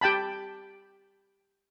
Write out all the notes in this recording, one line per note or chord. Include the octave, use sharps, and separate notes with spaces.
G4 G5 A5 B5